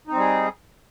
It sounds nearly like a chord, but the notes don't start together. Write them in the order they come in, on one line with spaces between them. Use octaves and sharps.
D#4 C4 G3 G#4